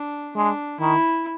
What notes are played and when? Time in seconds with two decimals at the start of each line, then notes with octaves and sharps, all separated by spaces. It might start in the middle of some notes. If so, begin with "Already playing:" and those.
Already playing: D4
0.36 G#3 D4
0.80 D#3 E4